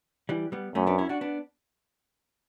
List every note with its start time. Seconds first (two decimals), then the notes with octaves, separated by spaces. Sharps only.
0.29 E3 G3
0.52 G3 B3
0.75 F#2 A3 C#4
0.87 B3 D4
0.98 C#4 E4
1.09 D4 F#4
1.21 B3 D4